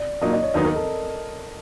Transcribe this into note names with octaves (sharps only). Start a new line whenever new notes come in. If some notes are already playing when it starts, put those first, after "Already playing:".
Already playing: D5
A#1 A#2 F#3 A#3 D#4 D#5
D#5
C#5
D#2 D#3 F#3 B3 D#4 D#5
A#4
A4